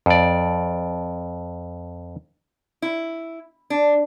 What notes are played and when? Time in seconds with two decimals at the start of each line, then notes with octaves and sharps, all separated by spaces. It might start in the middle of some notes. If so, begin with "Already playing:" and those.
0.06 F2 D5
2.82 E4
3.70 D4